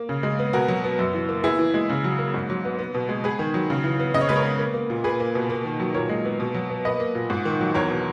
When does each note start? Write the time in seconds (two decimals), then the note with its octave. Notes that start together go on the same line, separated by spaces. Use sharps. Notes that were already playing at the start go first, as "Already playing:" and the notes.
Already playing: A#3
0.09 C#3
0.23 G#3
0.39 B3
0.53 B2 F#4 A#4
0.68 F#3
0.84 B3
0.99 F#2
1.14 E3
1.29 A#3
1.44 B3 E4 G#4
1.59 E3
1.74 G#3
1.90 C#3
2.04 F#3
2.19 A#3
2.34 G#2
2.50 F#3
2.65 B3
2.79 B3
2.94 B2
3.09 G#3
3.24 B3 G#4 B4
3.39 D#3
3.54 F#3
3.70 C#3
3.84 E3
3.99 B3
4.14 C#3 D#5
4.21 C#5
4.29 G#3 B4
4.36 A#4 C#5
4.44 B3
4.59 A#3
4.74 A#3
4.90 A#2
5.04 A#3 G#4 B4
5.20 A#3
5.35 B2
5.50 A#3
5.65 D#3
5.80 F#3
5.94 A#2 A#4 C#5
6.09 G#3
6.25 B3
6.40 B2
6.54 F#3
6.70 B3
6.85 A#3 B4 D#5
7.00 A#3
7.15 A#2
7.30 G#2
7.45 D#3
7.61 F#3
7.74 E2 A#4 C#5
7.90 B2